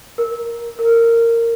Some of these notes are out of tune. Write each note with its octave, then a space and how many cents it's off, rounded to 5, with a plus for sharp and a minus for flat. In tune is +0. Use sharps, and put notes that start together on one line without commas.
A#4 +5
A#4 -15